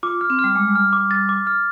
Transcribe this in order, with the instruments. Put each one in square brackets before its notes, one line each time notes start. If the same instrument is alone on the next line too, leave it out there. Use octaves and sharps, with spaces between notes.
[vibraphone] F4 [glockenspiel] D6
[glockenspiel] F6
[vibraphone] C4
[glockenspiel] F6
[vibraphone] G3
[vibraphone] G#3 [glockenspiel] D6
[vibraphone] G3
[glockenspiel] F6
D6
A6
D6
F6